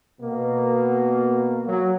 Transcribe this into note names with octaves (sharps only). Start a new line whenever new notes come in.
B2 A#3
F#3